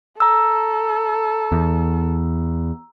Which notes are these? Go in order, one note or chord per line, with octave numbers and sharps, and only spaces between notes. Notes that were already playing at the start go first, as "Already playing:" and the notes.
A4 A#5 E6
E2